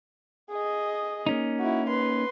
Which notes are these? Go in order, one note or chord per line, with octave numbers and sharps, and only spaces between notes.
G#4 D#5
A#3 C#4 D#4
E4 F#4
B4 C6